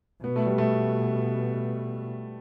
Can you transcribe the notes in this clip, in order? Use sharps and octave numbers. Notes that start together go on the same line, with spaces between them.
B2 B3
A3
G3
A3